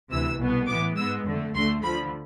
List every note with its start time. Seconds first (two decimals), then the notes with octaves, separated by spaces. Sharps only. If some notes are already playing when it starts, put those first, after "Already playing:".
0.11 D2 C3 E3 E6
0.39 C2 B2 B3
0.68 A2 E3 B3 D6
0.97 G#2 G#3 B3 E6
1.25 F2 D3 A3
1.55 D2 D3 A3 C6
1.83 D2 D3 F3 B5